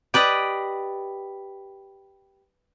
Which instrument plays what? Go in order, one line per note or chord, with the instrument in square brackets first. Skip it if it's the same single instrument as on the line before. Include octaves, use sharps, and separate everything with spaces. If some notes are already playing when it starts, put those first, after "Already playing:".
[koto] G4 B4 D5 D#5